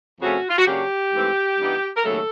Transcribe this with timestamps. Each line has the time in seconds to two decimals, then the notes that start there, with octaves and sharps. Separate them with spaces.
0.21 F2 C#3 F3 A3 C#4 F#4
0.50 F4
0.58 F#4
0.66 C#3 F#3 A#3 D4 G4
1.13 G#2 E3 A3 C4
1.58 G2 E3 G3 B3 D#4
1.97 A#4
2.04 D#2 C#3 F#3 A3 A4